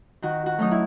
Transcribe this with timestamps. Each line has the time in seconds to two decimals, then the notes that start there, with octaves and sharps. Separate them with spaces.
0.22 D#3 F#4
0.46 F#4
0.58 F#3 A3 C#4 D#4
0.71 E4